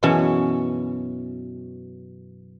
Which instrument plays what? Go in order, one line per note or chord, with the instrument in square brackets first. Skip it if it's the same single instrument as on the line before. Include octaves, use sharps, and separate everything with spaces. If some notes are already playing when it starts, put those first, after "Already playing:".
[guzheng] F#2 B2 E3 C#4 C#5 A5